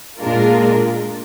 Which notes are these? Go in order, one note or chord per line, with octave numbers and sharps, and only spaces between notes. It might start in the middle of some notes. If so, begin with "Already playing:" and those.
A#2 G#3 D4 F4 A#4